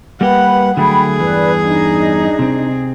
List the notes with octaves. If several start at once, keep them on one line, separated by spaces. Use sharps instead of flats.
G3 A#3 G4 B4 F#5
D3 F#3 A3 G#4 G5 B5
E2 G2 E3 B4 D5
D4 D#4
C3 C4